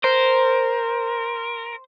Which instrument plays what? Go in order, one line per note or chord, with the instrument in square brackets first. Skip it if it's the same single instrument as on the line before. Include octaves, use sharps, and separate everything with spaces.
[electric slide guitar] A#4 [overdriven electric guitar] C5